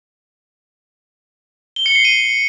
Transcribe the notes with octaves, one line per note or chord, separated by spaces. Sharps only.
G7
C#7
C7
D#7